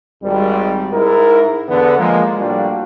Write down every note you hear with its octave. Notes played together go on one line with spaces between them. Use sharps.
G#1 G3
G#2 E4 A#4
E2 D3 B3
F3 G#3 A#3
A2 G3 A#3 D4 F4 F#4